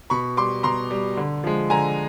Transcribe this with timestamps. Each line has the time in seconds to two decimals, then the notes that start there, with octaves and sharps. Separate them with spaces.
0.10 B2 B5 C#6
0.37 G3 C6 D6
0.63 B2 A#5 C6
0.91 G3
1.17 D3
1.44 F3 G#3
1.70 D3 G#5 A#5